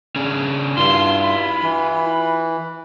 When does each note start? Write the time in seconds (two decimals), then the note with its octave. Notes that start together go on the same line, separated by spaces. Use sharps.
0.16 C#4 D4 G#4
0.77 G2 E4 F4 C6
1.22 B5
1.63 E3